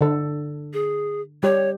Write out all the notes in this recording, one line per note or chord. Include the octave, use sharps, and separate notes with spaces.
D3 A4
G#4
G3 G4 C#5